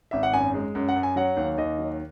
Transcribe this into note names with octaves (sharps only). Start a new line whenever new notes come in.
G#1 E5
F#5
F#2 G#5
G#3
F#2
F#5
F#2
G#5
F#3 F#5
D#2
D#2 D#5
F#3